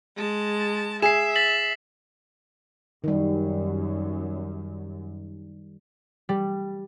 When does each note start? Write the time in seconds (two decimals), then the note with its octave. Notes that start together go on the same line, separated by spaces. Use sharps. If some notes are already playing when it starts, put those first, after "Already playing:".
0.16 G#3 A5
1.02 G#4 E5 C7 E7
1.36 A6 B6 F#7
3.04 F#2 D#3 G3
6.29 G3